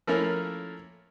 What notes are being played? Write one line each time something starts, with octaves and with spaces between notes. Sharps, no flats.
F3 A3 A#3 C#4 E4 A#4